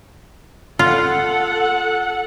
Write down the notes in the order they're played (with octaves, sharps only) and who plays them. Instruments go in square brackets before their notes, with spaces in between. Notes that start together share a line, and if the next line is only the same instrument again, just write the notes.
[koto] F4 [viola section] A4 F#5